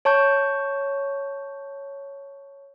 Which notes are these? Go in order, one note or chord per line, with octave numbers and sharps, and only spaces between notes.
C#5 A5 C#6 G6